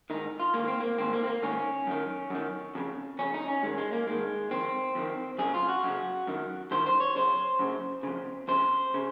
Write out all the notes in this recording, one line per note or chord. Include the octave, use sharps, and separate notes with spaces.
G#2 D#3 D#4
F4
G#2 D#3 A#3
C4
A#3
G#2 D#3 C4
A#3
C4
A#3
G#2 D#3 C#4
F#2 D#3
F#2 D#3
F2 C#3
F2 C#3 C#4
D#4
C#4
G#2 D#3 G#3
G#3
A#3
G#2 D#3 G#3
F2 D#3 C4
F2 D#3
F#2 C#3 G#4
F4
F#4
F#2 C#3
F#2 D#3
F#2 D#3 C5
C5
C#5
F#2 C#3 C5
F#2 C#3
F2 C#3
F2 C#3 C5
C#3